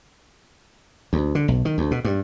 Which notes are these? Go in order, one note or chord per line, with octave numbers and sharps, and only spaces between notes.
D2
D3
B1
D#3
D2
B2
G2